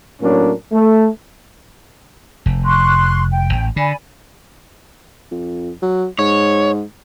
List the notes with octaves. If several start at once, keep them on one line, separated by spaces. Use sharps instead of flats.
A2 F#3 A#3 C#4 D4 A#4
A3
F1
C6 C#6 F#6
G5
A1
D3 D5 G#5 B5
F2
F#3
G#2 C#5